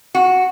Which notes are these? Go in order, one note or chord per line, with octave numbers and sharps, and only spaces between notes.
F#4